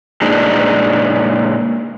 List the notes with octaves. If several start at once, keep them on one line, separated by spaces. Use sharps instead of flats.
A#2 G#3 D4 D#4